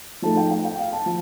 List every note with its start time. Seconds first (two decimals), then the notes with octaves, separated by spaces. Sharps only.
0.22 F3 A3 D#4 A5
0.37 G5
0.51 G5
0.65 G5
0.79 F5
0.93 A5
1.06 F3